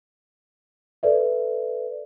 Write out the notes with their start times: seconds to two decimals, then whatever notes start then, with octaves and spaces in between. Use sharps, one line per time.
1.03 A4 B4 D5 E5